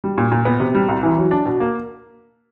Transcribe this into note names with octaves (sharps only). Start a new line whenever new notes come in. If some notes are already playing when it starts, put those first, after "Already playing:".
G3
A#2
A#2
B3
C3
G3
C2
E3
F#3
D4
B2
A#3